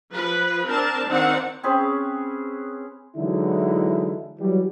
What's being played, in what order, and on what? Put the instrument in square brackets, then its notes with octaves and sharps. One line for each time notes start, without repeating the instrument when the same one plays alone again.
[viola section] F3 B4
C4 D4 A#4 A5
D#3 C4 D4 D#4 F5 F#5
[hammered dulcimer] C4 C#4 G#4 B4
[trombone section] D3 E3 F#3 G#3 D#4 E4
E3 F#3 G3